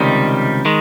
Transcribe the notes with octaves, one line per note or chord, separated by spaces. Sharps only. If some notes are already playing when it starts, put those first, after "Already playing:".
Already playing: C#2 C3 D#3 G3
D#3 G#3